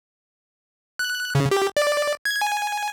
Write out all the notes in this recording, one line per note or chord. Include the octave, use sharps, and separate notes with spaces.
F#6
C#3
G4
D5
G#6
G#5